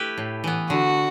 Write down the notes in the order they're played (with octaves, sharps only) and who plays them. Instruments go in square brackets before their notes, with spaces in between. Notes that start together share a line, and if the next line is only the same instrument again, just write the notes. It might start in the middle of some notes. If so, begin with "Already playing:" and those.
Already playing: [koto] A3 E4 G4 B4
A2
E3 B3
[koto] D3 [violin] F#4